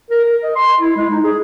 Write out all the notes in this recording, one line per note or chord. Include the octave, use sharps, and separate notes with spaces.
A#4
A#4
D#5
C6
E4
G#3
D#4
G#4